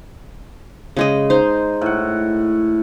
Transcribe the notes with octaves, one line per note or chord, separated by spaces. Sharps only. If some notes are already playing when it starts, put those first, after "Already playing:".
C#3 G#3 D#5
D#4 C5
A2 F#5